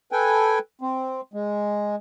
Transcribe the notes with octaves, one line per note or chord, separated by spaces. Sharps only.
A4 B4 G5 G#5
C4
G#3